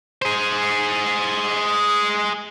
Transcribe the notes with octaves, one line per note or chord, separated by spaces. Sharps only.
G#4 C5